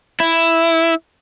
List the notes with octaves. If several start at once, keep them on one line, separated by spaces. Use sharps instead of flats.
E4